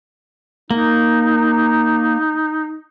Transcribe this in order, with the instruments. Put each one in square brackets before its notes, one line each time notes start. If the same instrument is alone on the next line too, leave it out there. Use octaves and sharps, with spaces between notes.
[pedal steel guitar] A#3 [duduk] D#4